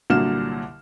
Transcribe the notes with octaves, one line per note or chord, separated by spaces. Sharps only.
C2 A#2 D3 F#3 F6 E7